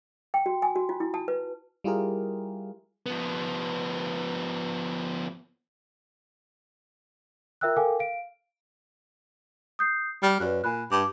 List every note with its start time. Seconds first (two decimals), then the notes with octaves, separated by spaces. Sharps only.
0.34 G5
0.46 F#4
0.62 G#5
0.76 F#4
0.89 F4
1.00 E4
1.14 A5
1.28 B4
1.84 G3 E4 F4 G4 G#4 A#4
3.06 F3 B3
7.61 F4 A#4 E5 G5 E6 F#6
7.77 A4 A#4 F5 G5 G#5 D6
7.99 F5 D7
9.79 D#6 G6 C7
10.23 G3 F6
10.40 F#2 B4 D5 F#6
10.64 A#2 G#5 B5 F#6
10.92 G2 D6